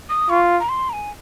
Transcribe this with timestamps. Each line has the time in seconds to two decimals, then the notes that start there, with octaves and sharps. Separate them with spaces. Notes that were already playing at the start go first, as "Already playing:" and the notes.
0.09 D#6
0.29 F4 C#6
0.60 A#5
0.69 C6
0.89 A#5
0.93 G#5